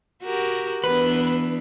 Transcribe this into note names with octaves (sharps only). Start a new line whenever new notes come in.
F#4 G4 A#4
E3 B3 D4 B4